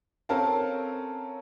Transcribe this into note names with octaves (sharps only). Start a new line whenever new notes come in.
C4 C#4 A4 A#4 F5 A5